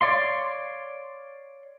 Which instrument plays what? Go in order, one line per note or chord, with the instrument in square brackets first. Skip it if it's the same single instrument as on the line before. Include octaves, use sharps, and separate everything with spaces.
[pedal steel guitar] C#5 D5 F5 C6